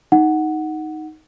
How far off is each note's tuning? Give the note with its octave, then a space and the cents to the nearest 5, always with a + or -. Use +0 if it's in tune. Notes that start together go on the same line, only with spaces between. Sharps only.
D#4 +5 F#5 +0